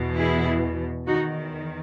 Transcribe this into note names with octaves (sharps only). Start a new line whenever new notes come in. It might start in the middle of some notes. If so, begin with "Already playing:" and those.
Already playing: E2 B2
E4 G#4
E2 D#3 D#4 F#4